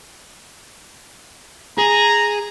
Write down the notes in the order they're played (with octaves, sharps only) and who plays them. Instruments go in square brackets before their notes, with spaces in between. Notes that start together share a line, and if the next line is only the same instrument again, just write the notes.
[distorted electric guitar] G#4 [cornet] A#5